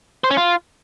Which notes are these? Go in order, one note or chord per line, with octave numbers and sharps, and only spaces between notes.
C5
C#4
F4